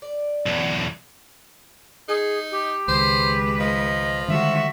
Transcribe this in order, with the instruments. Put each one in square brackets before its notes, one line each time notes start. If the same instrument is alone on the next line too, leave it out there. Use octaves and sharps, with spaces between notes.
[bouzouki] D5
[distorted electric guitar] B1 E2
[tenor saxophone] D#4 [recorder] G#4
[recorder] G4
[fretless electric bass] C#2 D#3 [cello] G#3 B4 [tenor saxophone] C5
[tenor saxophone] F3 [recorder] D#5
[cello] D3 F#4 [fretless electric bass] D#3 G3 G#3 [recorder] E5